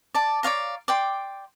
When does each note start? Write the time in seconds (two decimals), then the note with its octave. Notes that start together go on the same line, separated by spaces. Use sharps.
0.15 D5 A5
0.43 C#5 D5 F5 A#5
0.88 D5 G5 C6